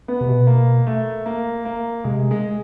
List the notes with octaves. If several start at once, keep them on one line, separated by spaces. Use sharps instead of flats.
B3
C3
B2
A#3
A3
A#3
A#3
C3 G#3
G#3